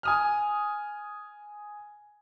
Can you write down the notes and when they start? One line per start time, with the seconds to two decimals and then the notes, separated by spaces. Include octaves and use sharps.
0.03 G#5 D#6 F6